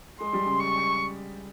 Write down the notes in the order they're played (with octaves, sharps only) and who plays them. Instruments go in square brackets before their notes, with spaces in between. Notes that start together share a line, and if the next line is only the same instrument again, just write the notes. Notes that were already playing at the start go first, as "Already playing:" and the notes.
[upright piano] G#3 [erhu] C6
[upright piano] G3
C#3
[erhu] C#6